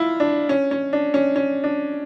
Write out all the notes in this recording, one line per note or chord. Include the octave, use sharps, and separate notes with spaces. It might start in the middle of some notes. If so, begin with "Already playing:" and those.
Already playing: E4 F4
D4
C#4
C#4
D4
C#4
C#4
D4